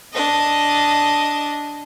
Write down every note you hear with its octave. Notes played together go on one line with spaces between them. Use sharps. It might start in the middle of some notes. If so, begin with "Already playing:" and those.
D4 D#5